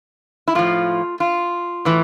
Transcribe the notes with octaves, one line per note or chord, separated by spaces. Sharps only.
E4
A2 F3 F4
F4
A2 E3